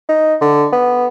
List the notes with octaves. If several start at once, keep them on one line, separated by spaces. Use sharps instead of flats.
D#4
D3
B3